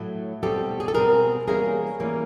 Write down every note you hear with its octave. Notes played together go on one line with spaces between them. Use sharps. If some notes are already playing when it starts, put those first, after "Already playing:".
Already playing: A2 F#3 A3
B2 G3 C4 G4 A4
G#4
A4
B2 G3 C4 G#4 A#4
E3 G3 A#3 C#4 G#4 A#4
E3 G3 A#3 C#4